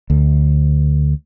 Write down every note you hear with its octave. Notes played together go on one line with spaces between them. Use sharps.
D2